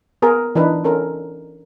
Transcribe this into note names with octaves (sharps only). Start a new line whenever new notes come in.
B3 G#4 A#4
E3 D4 D#4 B4
C#4 A4 A#4